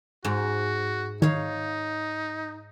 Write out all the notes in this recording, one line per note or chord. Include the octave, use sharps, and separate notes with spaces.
G#2 F#4
D#3 D#4 C#5 F5